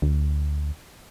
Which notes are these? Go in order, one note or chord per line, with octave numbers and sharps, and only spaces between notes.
D2